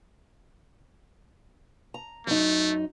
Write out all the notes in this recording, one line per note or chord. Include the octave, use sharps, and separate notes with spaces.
A#5
F#2 A3 D#4